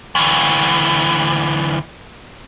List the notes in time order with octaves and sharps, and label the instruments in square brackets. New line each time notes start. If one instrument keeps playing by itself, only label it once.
[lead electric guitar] D2 E3